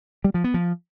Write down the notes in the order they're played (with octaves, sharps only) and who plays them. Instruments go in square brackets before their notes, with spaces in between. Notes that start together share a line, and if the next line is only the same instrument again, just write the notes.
[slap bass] G3
F3
B3
F3